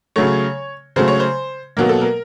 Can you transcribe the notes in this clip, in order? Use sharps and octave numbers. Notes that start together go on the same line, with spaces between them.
C#3 F#3 A3 C#5
C#3 F#3 A3 C5
C#5
C5
B2 F#3 A#3 A#4
A4
A#4